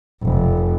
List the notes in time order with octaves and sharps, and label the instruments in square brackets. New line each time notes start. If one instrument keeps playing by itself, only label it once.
[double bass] F1